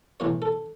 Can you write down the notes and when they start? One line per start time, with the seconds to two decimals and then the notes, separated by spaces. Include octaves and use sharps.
0.20 B1 A2 E3 C#5
0.42 A4